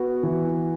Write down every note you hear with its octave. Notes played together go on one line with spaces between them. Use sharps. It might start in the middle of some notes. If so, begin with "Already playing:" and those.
Already playing: B3 F#4
E3